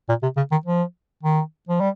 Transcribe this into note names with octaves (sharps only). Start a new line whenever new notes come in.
A#2
C3
C#3
D#3
F3
D#3
F3
G3